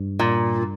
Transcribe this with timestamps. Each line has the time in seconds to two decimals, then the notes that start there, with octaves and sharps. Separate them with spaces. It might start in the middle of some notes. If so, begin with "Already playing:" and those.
Already playing: G2
0.19 A#2